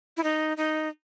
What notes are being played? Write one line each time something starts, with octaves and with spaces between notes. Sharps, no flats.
E4
D#4
D#4